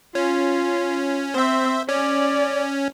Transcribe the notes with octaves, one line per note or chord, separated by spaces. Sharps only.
C#4 F4
C4 C5 E5
C#4 D5